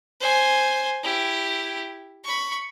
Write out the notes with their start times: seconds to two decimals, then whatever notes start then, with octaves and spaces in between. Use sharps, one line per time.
0.20 C5 G#5
1.03 E4 G4
2.24 B5 C#6